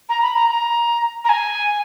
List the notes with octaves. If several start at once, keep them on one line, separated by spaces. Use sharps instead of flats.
A#5
B5
A#5
A#5
A#5
G#5